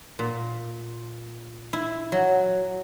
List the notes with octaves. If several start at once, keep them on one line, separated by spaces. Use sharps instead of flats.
A#2
E4
F#3